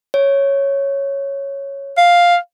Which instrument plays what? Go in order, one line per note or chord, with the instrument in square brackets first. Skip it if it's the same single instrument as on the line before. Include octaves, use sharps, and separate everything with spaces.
[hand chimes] C#5
[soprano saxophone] F5